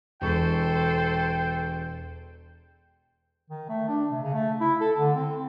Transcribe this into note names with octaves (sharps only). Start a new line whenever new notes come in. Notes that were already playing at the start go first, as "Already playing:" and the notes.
E1 A4 C5 G5 C#6
D#3
A3
D4
C3
C#3
A3
E4
A4
D3
C4